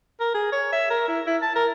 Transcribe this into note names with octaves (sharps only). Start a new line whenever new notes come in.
A#4
G#4
C#5
E5
A#4
E4
E4
A5
A#4